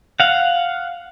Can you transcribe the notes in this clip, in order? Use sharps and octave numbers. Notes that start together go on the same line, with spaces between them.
F5 F#5